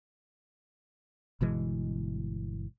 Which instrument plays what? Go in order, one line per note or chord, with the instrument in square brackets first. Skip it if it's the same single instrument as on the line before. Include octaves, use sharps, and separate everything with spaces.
[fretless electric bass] G1 B2 E3 G#3